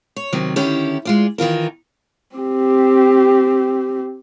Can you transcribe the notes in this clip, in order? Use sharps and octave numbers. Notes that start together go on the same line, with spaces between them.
C#5
C3 D#3 F#3 C4
D3 D#3 C#4 E4 G4
G#3 F4 D5
D#3 E3 F4 A#4
C4 G4